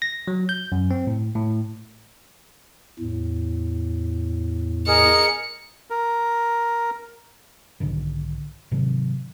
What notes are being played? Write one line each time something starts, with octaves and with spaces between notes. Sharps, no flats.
A#6
F#3
G6
F#2
C4
A2
A2
E2 A2
G#4 A#4 D#5 C#7
A#4
B1 G#2 D3 D#3
G#2 C3 D#3 F#3